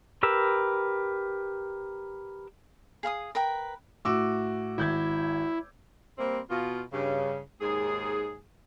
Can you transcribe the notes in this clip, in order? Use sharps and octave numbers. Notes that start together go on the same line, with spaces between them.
G4 A#4 B4 E6
G#4 F5 B5 D#6
A#4 B4 G5
A2 F#4 D6 E6
G#1 E4 G6 G#6
G3 A#3 C4
B2 F4
G2 C#3
D#2 G#2 G#4